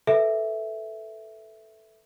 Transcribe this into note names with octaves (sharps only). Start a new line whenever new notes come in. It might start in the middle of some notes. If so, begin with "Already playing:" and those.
A4 B4 E5